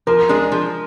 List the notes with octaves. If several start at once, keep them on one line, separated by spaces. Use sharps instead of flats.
F3 A#4
G#3 D4 G#4
F3